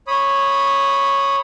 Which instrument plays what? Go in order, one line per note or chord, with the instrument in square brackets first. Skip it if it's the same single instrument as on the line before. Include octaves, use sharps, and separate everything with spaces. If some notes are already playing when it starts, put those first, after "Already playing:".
[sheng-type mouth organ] C#5 B5 D#6